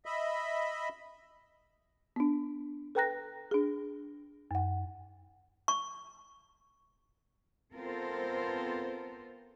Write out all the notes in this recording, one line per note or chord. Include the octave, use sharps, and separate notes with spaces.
D#5 E5 B5
B3 D4
A4 B4 G5 A#5 F#6 A#6
D4 G#4
F#2 F#5
C#6
B3 C4 F4 A4 A#4 C5